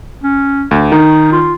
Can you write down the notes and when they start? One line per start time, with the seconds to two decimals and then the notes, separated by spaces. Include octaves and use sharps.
0.23 C#4
0.71 D2
0.92 D#3 D#4
1.32 F4